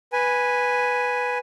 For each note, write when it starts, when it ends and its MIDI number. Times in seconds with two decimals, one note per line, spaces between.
0.13 1.38 71
0.13 1.38 80